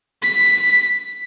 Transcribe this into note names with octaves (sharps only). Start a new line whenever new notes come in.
B6